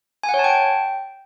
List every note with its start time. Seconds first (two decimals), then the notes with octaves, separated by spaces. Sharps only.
0.23 G#5
0.29 F#5
0.34 C#5
0.39 A5
0.44 G5